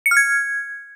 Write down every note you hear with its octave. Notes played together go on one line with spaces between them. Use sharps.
C#7
F6
G#6